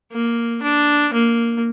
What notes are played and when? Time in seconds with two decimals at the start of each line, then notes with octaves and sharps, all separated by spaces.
0.12 A#3
0.62 D4
1.13 A#3